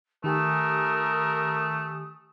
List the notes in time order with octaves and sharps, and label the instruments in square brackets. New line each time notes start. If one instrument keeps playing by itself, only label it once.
[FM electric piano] D#3 G4 G#5 [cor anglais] A3 [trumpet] A#4 [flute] D#6